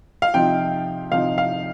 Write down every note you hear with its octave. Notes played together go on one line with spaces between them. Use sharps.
F5
C3 F3 D#4 G5
C3 F3 D#4 F5
F5